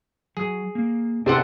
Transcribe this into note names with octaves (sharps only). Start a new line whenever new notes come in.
F#3 G#4
A#3
C3 D4 A4 C5 F#5 G5 A5